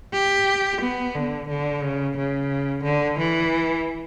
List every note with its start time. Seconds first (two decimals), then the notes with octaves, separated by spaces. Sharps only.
0.13 G4
0.81 B3
1.14 D3
1.48 D3
1.82 C#3
2.17 C#3
2.83 D3
3.18 E3